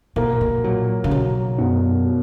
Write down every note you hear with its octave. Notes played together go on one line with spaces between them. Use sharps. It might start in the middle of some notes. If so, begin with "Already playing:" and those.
B2 A#3
B2
A#2 F#3
C#3
B2 F#3
F#2 B2
F#3